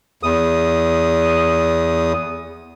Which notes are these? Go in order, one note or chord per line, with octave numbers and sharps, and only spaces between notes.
E2 D#6